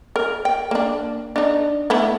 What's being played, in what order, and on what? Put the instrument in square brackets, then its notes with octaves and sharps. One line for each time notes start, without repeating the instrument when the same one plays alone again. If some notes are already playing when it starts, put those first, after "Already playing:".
[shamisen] A#4
G5
A#3 D4
D4 D#4
A3 B3 E4